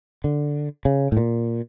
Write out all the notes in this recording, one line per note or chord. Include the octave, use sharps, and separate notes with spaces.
D3
C#3
A2
A#2